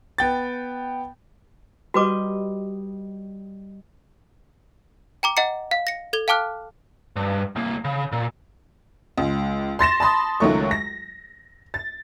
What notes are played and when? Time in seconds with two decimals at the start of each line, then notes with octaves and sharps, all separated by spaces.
0.18 B3 G5 A6
1.94 G3 F#4 B4 D#5 D6
5.23 G5 A#5 D6
5.37 D#5 F#5 A#5 C#7
5.71 F5
5.87 A#6 C#7
6.13 A4 G#6 G7
6.28 F5 G5 A5 D6 F6 F#6
7.16 G2
7.56 C2 A#3
7.85 C#3
8.12 A#2
9.18 C#2
9.79 C6 A6 A#6 E7
10.00 A5 B5 C6 D#6
10.40 C#2 D#3 F#3 A3 C#6
10.71 A#6
11.74 A6